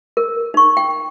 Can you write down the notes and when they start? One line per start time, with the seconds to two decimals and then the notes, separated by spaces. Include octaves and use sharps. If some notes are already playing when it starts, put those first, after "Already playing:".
0.17 A#4
0.54 D#4 C#6
0.77 G5